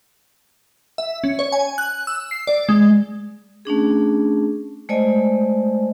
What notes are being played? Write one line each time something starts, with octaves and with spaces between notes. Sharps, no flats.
E5
C#4
C#5
G#5
F#6
E6
C7
D5
G#3
A3 C#4 D4 G#4
G#3 A3 C5 D5 D#5 G#5